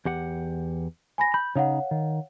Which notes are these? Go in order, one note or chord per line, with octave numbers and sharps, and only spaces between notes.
E2 G4 F#5
G#5 B5 A#6
B5 G6
C#3 D#4 C#5 F5 F#5
D#3